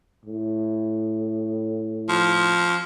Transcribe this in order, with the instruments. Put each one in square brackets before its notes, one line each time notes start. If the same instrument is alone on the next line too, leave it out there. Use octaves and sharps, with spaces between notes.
[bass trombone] A2
[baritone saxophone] F3